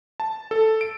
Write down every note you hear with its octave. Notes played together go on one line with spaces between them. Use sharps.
A5
A4
D7